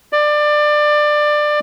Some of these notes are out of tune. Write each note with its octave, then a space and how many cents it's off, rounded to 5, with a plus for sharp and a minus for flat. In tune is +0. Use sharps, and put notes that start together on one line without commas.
D5 +20